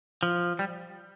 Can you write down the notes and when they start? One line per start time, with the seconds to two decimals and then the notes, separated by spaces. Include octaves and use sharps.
0.23 F3
0.59 G3